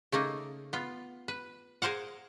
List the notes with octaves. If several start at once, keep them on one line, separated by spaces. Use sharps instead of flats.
C#3 A3 A#3 D#4
B3 F4
B4
G#4 A#4 C5 F5 F#5